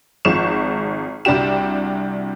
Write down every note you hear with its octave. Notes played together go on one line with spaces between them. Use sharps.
G#1 F3 G#3 C#6 E7
C2 G3 D4 F#4 G4 E7